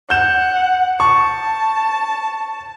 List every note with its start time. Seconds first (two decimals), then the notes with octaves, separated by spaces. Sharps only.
0.10 F#5 G6 E7
1.00 A5 C#6